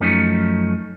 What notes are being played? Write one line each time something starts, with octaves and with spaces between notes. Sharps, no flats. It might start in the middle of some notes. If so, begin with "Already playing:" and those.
F#2 F3 A3 C#4 D#4